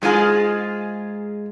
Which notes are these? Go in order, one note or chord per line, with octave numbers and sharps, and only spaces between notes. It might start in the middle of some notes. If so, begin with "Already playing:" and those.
G#2 G#3 B3 F4 G#4